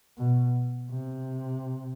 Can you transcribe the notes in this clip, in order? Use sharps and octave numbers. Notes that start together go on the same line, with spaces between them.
B2
C3